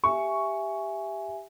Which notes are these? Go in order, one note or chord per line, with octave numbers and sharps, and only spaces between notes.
G4 E5 G#5 C#6